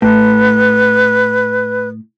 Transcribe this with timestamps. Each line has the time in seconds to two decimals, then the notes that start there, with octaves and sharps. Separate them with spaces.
0.02 A2 B4